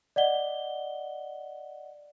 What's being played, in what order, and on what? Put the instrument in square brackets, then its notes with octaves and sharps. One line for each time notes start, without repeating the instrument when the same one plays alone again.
[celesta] D5 D#5 F#5 G7